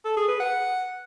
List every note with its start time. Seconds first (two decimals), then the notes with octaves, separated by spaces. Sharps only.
0.05 A4
0.17 G#4
0.28 B4
0.40 F#5